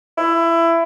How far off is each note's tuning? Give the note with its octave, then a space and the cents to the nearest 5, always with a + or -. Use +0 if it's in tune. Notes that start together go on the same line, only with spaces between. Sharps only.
E4 +20